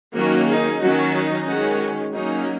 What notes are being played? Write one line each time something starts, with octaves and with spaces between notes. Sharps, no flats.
D#3 F#3 A#3 C#4 F#4
D#4 G#4
D#3 F#3 C#4 F#4
D#4
D#3 G#3 C#4 F#4
F#3 A#3 C#4 D#4